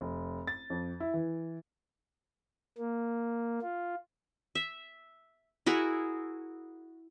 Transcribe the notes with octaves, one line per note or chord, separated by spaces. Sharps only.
F1
A6
F2
E4
E3
A#3
F4
E5
E4 F#4 G#4 A#4